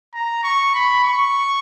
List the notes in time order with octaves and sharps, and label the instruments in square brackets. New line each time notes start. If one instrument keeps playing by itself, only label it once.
[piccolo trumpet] A#5
C#6
B5
C#6